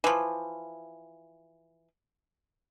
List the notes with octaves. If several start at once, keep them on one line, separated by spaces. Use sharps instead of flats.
E3 F3